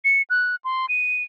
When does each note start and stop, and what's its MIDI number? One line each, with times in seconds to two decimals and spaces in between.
0.04 0.22 97
0.30 0.56 90
0.64 0.86 84
0.89 1.23 99